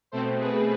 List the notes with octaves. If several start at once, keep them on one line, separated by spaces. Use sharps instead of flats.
B2 A3 C4 A4 C5
G#4 B4